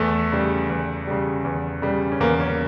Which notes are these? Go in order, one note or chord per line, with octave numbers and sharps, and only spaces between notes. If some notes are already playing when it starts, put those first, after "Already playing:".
Already playing: E2 A3
C#3 G3
E2
C#3 G3
E2
C#3 G3
C#4
E2 A#3
C#4